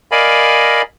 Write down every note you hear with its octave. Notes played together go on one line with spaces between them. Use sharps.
A#4 D5 D#5 F5 G#5 B5